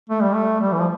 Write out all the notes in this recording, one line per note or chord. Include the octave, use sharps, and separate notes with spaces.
A3
G3
A3
G3
E3
F3